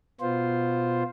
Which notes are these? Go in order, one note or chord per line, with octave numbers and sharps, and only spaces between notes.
B2 B3 F4 C5